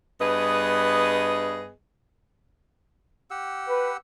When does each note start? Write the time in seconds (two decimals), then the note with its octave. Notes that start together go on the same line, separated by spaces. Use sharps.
0.21 G2 B3 G#4 B4 D#5
3.31 G4 F#5 E6
3.69 B4